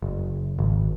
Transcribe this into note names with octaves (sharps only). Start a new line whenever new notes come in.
F#1
G#1